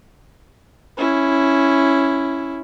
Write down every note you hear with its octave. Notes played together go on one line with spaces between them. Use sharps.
C#4 E4